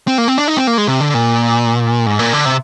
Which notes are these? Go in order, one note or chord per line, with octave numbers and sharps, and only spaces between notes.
C4
A#3
C4
D4
D#4
C4
A#3
G#3
C3
D3
A#2
G#2
A#2
D3
C3